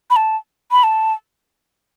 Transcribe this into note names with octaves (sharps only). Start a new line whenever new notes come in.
B5
A5
B5
A5